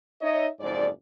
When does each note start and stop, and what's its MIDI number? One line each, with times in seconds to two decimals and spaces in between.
0.22 0.47 63
0.22 0.47 73
0.22 0.47 75
0.22 0.47 76
0.60 0.88 30
0.60 0.88 41
0.60 0.88 44
0.60 0.88 72
0.60 0.88 74